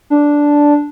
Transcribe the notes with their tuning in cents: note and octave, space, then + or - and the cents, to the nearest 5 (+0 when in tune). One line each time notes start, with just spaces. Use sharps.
D4 -5